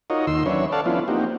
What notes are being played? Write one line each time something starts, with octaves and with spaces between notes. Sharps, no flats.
D#4 F4 F#4 A#4 C#5 D#5
D#2 D#3 C6 E6
F#3 C#4 D4 B4 C#5 E5
A4 C#5 D5 F5 F#5 A5
F3 B3 C#4 D4 E4 F4
A#3 C4 D#4 F#4 G4